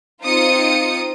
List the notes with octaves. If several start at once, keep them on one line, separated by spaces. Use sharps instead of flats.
C4 D#4 F4 D#6 C#7